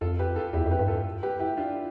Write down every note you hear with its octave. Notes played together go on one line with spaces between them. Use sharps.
F2 F4 A4
G4 B4
F4 A4
E2 E4 G4
F2
G4 B4
G2
F4 A4
G4 B4
E4 G4
D4 F4